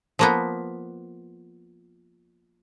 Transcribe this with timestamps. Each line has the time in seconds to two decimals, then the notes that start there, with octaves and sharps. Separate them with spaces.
0.19 F3 A#3 B3